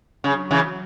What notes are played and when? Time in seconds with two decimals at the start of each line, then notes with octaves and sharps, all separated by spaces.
0.23 C#3 F#3
0.51 C#3 E3